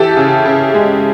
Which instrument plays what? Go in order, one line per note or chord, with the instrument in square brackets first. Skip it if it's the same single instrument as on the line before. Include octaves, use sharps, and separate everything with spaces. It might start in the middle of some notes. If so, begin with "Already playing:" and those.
Already playing: [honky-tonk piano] E3 G4 A4
C#3
C#3
G#3